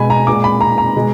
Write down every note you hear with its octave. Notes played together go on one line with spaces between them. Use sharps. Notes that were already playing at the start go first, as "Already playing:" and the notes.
Already playing: B2 G#3 G#5 B5
A#5
A#2 G#3 D6
B5
A#5
A#5
B2 G#3